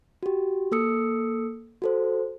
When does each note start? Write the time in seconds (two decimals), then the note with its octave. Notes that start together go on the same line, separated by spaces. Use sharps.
0.23 F#4 G4
0.72 A#3 A4 D#6 E6 C#7
1.82 F#4 A4 C5